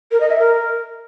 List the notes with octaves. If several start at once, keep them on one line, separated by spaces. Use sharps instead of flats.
A#4
D#5
E5
A#4